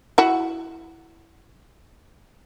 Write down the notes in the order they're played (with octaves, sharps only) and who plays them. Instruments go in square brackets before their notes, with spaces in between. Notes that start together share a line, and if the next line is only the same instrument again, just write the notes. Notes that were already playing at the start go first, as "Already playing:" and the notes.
[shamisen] E4 F#4